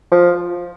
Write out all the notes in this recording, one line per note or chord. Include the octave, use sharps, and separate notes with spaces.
F3